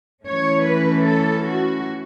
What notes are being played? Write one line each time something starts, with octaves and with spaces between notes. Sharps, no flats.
E3 A3 C#4 C#5
B4
A4
F#4